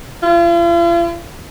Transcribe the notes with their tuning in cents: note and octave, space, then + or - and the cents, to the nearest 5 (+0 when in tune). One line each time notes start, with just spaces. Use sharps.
F4 -45